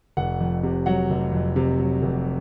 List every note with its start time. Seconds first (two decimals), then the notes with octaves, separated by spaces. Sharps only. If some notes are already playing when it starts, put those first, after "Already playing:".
0.17 F1 F#5
0.40 F2
0.63 C3
0.86 F#3 F#5
1.10 F1
1.33 F2
1.56 C3
1.79 F#3
2.02 F1